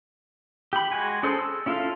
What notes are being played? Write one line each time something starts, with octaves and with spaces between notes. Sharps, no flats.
G4 B5
G#3 F#4 G#5
C#4 G#4 A4 C5
E6
C#4 E4 F4 A4 F5